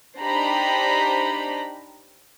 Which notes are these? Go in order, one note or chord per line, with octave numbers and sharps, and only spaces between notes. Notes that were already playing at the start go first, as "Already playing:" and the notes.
D4 D#4 G4 C5 A#5 B5